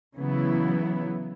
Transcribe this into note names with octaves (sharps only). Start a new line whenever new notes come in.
C#3 E3 F#3 B3 E4